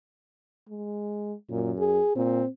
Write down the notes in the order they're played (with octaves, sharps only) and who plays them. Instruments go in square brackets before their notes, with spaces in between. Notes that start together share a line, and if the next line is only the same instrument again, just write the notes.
[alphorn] G#3
[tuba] F#2 [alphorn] A#2
[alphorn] G#4
[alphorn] A#2 [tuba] C4